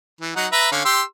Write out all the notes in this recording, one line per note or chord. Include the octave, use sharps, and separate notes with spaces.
E3
F#3 D#4 F#5
B4 E5 A#5
D3 C#4 F5
G4 C6 E6